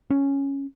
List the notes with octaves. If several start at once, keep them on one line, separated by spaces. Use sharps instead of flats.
C#4